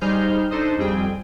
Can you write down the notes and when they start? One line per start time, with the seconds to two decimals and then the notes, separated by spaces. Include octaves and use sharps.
0.01 G3 D#4 G#4 C5 F6 G6
0.51 D4 D#4 A4 C5 D#5
0.78 F2 G3 C4 G#4 G5